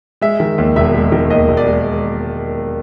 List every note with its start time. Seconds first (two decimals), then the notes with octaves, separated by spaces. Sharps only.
0.21 G#3 E5
0.40 D#3
0.58 D#2
0.76 E1 E5
0.95 G#3
1.12 D#3
1.30 D#2 D#5
1.48 E1
1.57 D5
1.67 G#3